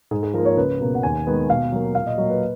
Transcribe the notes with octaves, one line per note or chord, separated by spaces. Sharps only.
G#2 G#4
G#4
F3 A#3 A#4
C#5
C#2 B4
B2 A#3
F#5
D#2 G#5
D#3 G#3 B3
B2 F5
F#3 A#3
A#2 F5
D#5
F#3 A#3 D#5
B4